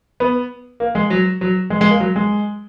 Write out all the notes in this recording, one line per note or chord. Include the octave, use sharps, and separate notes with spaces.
B3
A#3
G#3
F#3
F#3
G#3
G#3
A#3
F#3
G#3